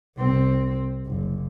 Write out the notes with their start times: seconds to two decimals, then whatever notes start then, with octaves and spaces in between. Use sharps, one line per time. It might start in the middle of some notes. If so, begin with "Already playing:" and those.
0.16 C2 C4
1.06 F#1